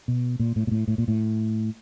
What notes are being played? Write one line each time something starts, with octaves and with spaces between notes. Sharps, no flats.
B2
A#2
A2
A#2
A2
A2
A#2
A2